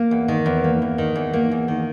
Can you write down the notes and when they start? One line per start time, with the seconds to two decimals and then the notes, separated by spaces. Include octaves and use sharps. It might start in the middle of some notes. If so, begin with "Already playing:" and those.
Already playing: A#3
0.11 E2
0.28 D#3
0.46 E2
0.64 A#3
0.82 E2
0.98 D#3
1.16 E2
1.33 A#3
1.51 E2
1.68 D#3